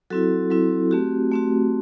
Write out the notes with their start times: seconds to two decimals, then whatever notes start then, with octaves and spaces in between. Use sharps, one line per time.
0.10 F#3 C4 E4 F#4 A4
0.50 F#3 C4 E4
0.91 A3 C4 F#4 G4
1.32 A3 C4 F#4